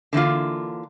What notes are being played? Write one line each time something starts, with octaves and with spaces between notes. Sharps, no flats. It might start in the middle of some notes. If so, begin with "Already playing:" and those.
D3 E3 A#3 F4